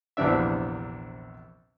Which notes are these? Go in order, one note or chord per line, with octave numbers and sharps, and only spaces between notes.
A#1 E2 C3 E3 D4 E5